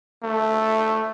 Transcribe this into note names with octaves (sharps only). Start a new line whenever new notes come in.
A3